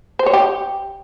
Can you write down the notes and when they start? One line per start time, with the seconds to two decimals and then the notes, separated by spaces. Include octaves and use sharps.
0.19 C5
0.26 C#5
0.33 G4